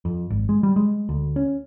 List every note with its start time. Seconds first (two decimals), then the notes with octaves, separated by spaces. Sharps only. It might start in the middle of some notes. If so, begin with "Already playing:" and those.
0.05 F2
0.30 G#1
0.49 G#3
0.63 G3
0.76 G#3
1.09 D2
1.36 C#4